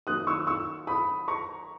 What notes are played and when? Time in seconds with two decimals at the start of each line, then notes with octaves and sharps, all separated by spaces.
0.07 D#3 F#3 A#3 D#6 F#6
0.27 C#6 E6
0.47 C#6 E6
0.87 B5 D#6
1.28 A#5 C#6